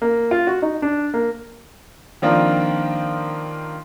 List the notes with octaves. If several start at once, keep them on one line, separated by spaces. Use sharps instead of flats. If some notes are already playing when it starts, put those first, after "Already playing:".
A#3
F4
F#4
D#4
D4
A#3
D#3 F3 A#3 C4 D4 F4